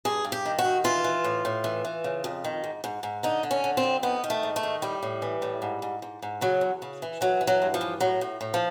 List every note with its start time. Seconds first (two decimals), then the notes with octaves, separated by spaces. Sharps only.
0.05 G2 G#4
0.24 G2
0.32 G4
0.45 D#3
0.59 F#4
0.65 D#3
0.84 E3 F4
1.04 E3
1.24 A2
1.45 A2
1.64 E3
1.85 E3
2.04 C#3
2.24 F2
2.44 D#3
2.64 G#2
2.84 G#2
3.03 G#2
3.23 D3 D#4
3.43 D3
3.51 C#4
3.64 D3
3.77 C4
3.83 F2
4.03 D#3 B3
4.24 D#3
4.30 A3
4.43 G#2
4.56 A3
4.63 D#3
4.82 A2 G3
5.03 A2
5.22 E3
5.42 A2
5.62 G#2
5.82 G#2
6.02 G#2
6.22 G#2
6.41 C#3 F#3
6.61 E2
6.82 C#3
7.02 E3
7.21 E3 F#3
7.41 E3
7.47 F#3
7.62 G2
7.74 F3
7.81 E3
8.00 A2 F#3
8.21 A2
8.41 A2
8.54 F3